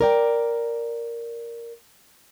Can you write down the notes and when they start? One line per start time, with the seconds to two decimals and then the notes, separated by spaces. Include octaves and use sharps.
0.01 A#4 D5 G5